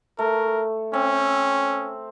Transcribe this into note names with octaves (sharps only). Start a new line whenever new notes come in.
A3 A#4
C4 C#4